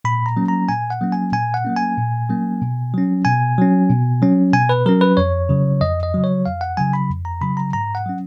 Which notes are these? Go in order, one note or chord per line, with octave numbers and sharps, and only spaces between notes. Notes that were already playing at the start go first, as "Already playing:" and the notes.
A#2 B5
A#5
F#3 A#3 C#4
A#5
A#2 G#5
F#5
F#3 A#3 C#4
G#5
A#2 G#5
F#5
F#3 A#3 C#4
G#5
A#2
F#3 A#3 C#4
B2
F#3 C#4
B2 G#5
F#3 C#4
B2
F#3 C#4
B2 G#5
B4
F#3 C#4 A#4
B4
F2 C#5
C#3 F#3
F2 D#5
D#5
C#3 F#3
C#5
F2 F5
F#5
C#3 F#3 G#5
B5
F2
A#5
C#3 F#3 B5
A#5
G#2 A#5
F#5
F#3 C#4